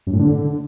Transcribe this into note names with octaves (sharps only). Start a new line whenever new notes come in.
F#2
A2
D3